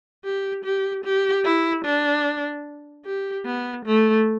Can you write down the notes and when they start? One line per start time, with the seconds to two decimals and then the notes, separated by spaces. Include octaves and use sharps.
0.25 G4
0.64 G4
1.04 G4
1.45 E4
1.85 D4
3.05 G4
3.46 B3
3.85 A3